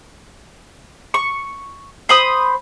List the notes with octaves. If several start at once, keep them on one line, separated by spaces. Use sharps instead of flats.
C#6
C5 B5 D#6